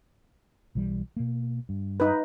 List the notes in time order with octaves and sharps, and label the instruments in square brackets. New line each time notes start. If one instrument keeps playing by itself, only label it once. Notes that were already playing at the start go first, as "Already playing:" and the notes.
[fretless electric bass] B1 E3 G3
B2 A#3
G2
[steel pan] D#4 B4